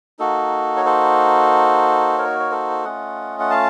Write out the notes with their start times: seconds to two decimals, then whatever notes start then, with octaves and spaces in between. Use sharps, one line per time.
0.19 A#3 D#4 F#4 A4
0.77 C#5
0.85 A4 C5
2.18 A#4 C#5
2.40 C#5
2.51 A4 C5
2.84 A3 C#4 F4 D#5 F#5
3.40 F#5
3.50 F5 A5